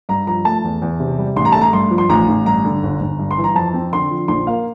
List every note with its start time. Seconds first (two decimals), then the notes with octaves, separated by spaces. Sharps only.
0.09 G2 A#5
0.27 F3 A#5
0.45 A3 A5
0.64 E2
0.82 E2
1.00 C3
1.19 G3
1.36 A1 C6
1.45 A#5
1.52 A3 A5
1.61 A#5
1.73 G2 C6
1.91 F3
1.98 C6
2.10 A1 A#5
2.28 A1
2.46 G2 A#5
2.65 D3
2.83 G1
3.01 G1
3.19 G2
3.31 C6
3.38 E3
3.44 A#5
3.55 F2 A5
3.74 C4
3.93 D3 C6
4.11 F3
4.28 A#1 C6
4.47 A#3 F5